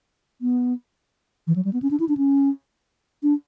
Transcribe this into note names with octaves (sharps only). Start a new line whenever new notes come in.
B3
E3
F#3
G3
B3
C#4
D4
E4
D4
C#4
D4